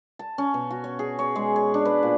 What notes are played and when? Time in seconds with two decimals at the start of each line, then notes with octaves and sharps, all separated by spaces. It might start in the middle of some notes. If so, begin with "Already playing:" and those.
0.19 A5
0.38 C#4
0.54 B2
0.71 F#4
0.84 C#5
0.99 G#4
1.19 C#5
1.36 G#3
1.56 C#5
1.74 D4
1.85 B4
2.03 A#2